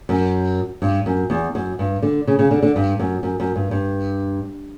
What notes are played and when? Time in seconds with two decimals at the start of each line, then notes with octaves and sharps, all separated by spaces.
0.09 F#2
0.82 G2
1.06 F#2
1.30 E2
1.55 F#2
1.79 G2
2.02 D3
2.27 C#3
2.39 C#3
2.51 D3
2.63 D3
2.76 G2
2.99 F#2
3.23 F#2
3.40 F#2
3.56 G2
3.71 G2